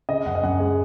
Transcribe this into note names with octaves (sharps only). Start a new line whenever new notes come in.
C#3 D#5
F#2 F#5
D#5
F#2 F#5
G#3